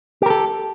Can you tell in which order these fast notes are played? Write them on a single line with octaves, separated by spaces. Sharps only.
G4 A#4 A4